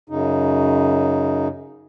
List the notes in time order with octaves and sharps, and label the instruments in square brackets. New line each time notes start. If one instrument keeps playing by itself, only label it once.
[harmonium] F#2 C#3 D#4